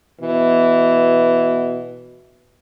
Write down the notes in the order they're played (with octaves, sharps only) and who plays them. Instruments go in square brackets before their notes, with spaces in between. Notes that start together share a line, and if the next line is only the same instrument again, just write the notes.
[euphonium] B2 [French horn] E3